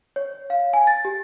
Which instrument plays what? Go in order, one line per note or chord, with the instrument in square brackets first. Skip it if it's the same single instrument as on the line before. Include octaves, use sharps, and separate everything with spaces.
[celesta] C#5
F5
G#5
A6
G4